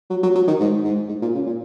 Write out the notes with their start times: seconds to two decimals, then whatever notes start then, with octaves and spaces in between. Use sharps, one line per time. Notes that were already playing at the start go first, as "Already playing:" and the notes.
0.10 F#3
0.23 F#3
0.36 F#3
0.48 D#3
0.60 G#2
0.85 G#2
1.09 G#2
1.22 A#2
1.35 C#3
1.46 A#2